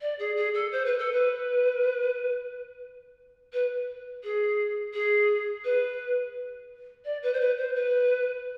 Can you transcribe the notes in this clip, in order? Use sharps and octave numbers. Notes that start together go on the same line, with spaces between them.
D5
G#4
G#4
A4
C5
B4
A4
B4
B4
G#4
G#4
B4
D5
B4
C5
B4
C5
B4